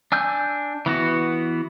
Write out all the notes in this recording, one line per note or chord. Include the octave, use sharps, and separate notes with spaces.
D4 G#5 E6 G6
E3 B3 F#4